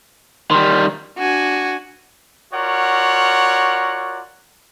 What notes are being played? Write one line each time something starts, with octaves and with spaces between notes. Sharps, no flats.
D#3 G3 C6
D4 F#4 G#5
F4 F#4 A#4 C#5 D5 F#5